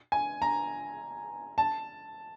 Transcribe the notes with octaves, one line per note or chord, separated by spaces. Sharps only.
G#5
A#5
A5